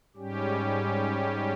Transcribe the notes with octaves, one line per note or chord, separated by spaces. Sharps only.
G#2 G3 C#4 G4